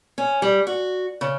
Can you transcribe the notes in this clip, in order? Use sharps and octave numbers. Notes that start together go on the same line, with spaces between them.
C#4
G3
F#4
C#3